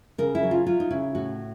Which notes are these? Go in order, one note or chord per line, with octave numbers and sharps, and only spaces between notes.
C#3 A#4
E4
F#3
F4
F#3 F4
D#4
C#3 E4
A2 F#4